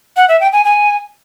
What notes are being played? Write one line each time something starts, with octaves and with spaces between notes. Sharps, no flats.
F#5
E5
G5
G#5
G#5